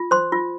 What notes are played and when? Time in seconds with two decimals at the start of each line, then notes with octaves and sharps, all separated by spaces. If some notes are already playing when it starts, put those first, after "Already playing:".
Already playing: F4
0.11 C5 C6
0.32 F4